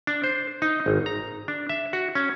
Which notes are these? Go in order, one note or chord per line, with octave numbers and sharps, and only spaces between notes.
D4
C5
D#4
G#1
A#5
D4
E5
F#4
C#4